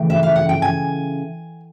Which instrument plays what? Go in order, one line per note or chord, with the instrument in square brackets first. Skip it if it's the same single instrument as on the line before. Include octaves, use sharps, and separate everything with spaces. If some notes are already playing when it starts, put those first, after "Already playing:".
Already playing: [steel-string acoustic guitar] C#3 E3 A3 G5
E5
F5
F#5
G5
G#5